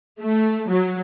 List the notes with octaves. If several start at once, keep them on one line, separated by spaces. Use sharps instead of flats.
A3
F#3